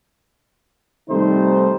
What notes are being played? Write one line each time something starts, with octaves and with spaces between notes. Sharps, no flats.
C3 D#3 G3 A3 D#4 C5